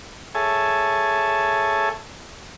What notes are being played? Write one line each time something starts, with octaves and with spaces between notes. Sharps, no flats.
G#4 A4 C#5 E5 G#5 A5